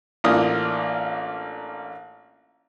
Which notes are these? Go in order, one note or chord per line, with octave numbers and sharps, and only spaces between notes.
A1 A#3 D4 F4 D#6